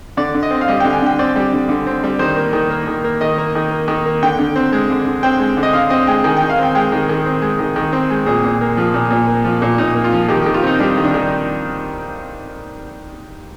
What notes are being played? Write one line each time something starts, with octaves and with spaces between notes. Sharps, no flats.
D3 D5
D3
D#5
C4
F5
G3 D#5
D3 G5
G#5
D3 G5
C4 D5
G3
D3
D3
C4
G3
D#3 C5
A#3
D#3
A#3
D#3
A#3
D#3 D#5
A#3
D#3
A#3
D#3
A#3
D3 G5
D3
C4
G#3
D3
D3
C4 G5
G#3
D3
D#5
D3 F5
C4 D#5
G#3 G5
D#3 G#5
G5
D#3
F5
C4 G5
G#3 G5
D#3
D#3
C4
G#3
D#3
D#3
C4
G#3
A#2 G#4
A#2
A#3
F3
A#2
A#2
A#3
F3
A#2
A#2 D#4
A#3
F4
F3
D#3 G4
D#3 G4
F4
C4 D#4
G3 D4
D#3
D4
D#3